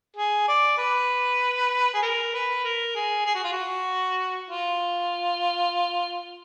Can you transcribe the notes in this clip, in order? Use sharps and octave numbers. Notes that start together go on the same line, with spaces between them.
G#4
D5
B4
G#4
A#4
B4
A#4
G#4
G#4
F#4
F4
F#4
F4